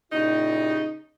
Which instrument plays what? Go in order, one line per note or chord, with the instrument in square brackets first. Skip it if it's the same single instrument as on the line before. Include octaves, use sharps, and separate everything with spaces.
[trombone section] A#2 E4 G4 [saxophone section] C#3 D#4